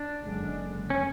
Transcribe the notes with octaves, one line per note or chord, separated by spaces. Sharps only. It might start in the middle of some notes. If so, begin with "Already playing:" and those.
Already playing: D4
F#1 F#2 D3 G#3
C#4